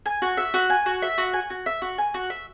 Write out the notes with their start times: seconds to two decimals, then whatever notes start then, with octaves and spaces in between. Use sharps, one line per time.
0.06 G#5
0.22 F#4
0.37 E5
0.54 F#4
0.70 G#5
0.86 F#4
1.02 E5
1.18 F#4
1.33 G#5
1.50 F#4
1.66 E5
1.82 F#4
1.98 G#5
2.14 F#4
2.30 E5